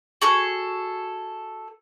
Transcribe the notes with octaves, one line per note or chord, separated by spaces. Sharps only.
F#4 G#4 A4